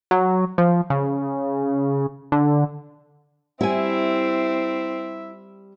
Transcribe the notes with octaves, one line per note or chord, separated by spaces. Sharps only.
F#3
F3
C#3
D3
G3 C4 E4 E5 G#5